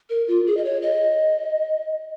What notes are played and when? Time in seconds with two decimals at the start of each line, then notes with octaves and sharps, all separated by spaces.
0.10 A#4
0.28 F4
0.47 G#4
0.57 D#5
0.65 C#5
0.82 D#5